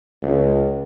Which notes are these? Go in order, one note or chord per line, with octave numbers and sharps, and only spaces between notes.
C#2